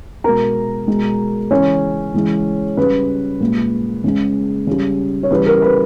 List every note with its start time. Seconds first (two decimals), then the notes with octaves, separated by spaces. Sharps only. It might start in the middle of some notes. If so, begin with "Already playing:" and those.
0.24 B2 G#3 A#4 A#5
0.88 B2 G#3
1.50 C#3 E3 G#3 C#4 C#5
2.14 C#3 E3 G#3
2.77 C#3 G3 B4
3.40 A#2 G#3
4.04 C#3 G#3
4.67 C#3 G3
5.23 C#5
5.31 C#3 E3 G3 B4
5.46 A#4
5.62 B4